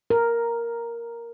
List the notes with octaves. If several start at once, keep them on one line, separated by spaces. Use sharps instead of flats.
A#4